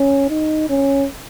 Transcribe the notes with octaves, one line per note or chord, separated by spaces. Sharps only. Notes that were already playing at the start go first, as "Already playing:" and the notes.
Already playing: C#4
D#4
C#4